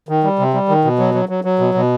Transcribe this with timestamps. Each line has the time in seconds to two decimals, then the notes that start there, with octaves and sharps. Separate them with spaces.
0.09 D#3
0.24 G3
0.39 C3
0.54 G3
0.69 D#3
0.85 B2
0.99 F#3
1.14 F#3
1.29 F#3
1.44 F#3
1.59 B2
1.75 B2